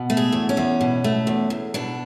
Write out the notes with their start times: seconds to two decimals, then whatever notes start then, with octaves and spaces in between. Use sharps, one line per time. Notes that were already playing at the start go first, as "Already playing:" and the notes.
Already playing: B2
0.10 A3
0.17 G#4
0.32 E2
0.49 C#4
0.57 E2
0.81 B2
1.04 A3
1.27 E2
1.50 E2
1.74 B2 D4